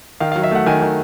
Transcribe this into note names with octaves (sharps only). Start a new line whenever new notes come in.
D#3 F5
F#3 F5
E5
A3 F#5
D#3 G#5
D#3